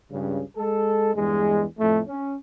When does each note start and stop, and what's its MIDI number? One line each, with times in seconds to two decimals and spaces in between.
0.12 0.42 37
0.12 0.42 43
0.12 0.42 49
0.56 1.11 56
0.56 1.11 69
1.15 1.65 40
1.15 1.65 43
1.15 1.65 56
1.79 2.01 41
1.79 2.01 45
1.79 2.01 57
2.08 2.35 61